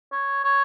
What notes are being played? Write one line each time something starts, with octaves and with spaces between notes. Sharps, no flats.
C#5
C#5